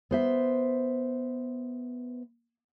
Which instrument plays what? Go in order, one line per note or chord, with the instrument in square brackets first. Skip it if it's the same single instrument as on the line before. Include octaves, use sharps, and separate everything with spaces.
[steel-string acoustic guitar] B3 C5 E5